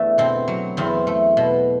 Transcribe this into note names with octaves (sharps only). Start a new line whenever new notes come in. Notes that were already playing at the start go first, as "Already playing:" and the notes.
Already playing: E2 A3 D4
B2 C4
F#3
E2 C4
A3
B2